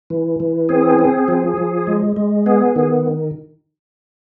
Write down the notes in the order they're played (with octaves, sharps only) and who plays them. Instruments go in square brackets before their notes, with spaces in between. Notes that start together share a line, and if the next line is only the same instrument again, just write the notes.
[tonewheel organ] E3
E3
C4 G#4
C4
F3
F3
G#3
G#3
B3 G#4
D#3 G#4